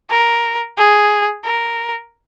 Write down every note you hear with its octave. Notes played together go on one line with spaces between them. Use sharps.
A#4
G#4
A#4